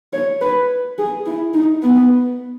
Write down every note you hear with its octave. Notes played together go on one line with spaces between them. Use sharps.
C#5
B4
G#4
E4
D#4
B3